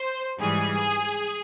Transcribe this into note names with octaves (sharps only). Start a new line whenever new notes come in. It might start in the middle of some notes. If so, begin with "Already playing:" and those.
Already playing: C5
G#2 E3 G3 G#4